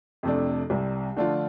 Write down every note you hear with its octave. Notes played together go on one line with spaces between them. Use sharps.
F2 C3 A3 D4
C2 C3 G3
D3 F3 A3 D4 F4